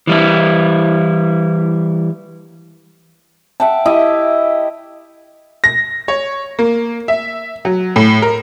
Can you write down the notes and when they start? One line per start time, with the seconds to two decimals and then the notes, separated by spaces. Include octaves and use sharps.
0.07 E3 G3 E4
3.60 E5 F#5 G5 A5
3.86 E4 G4 D#5
5.64 A#6
6.08 C#5
6.59 A#3
7.08 E5
7.65 F#3
7.96 A2
8.22 A#4